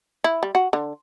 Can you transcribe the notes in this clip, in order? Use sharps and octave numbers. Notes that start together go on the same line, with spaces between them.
E4
G3
F#4
D3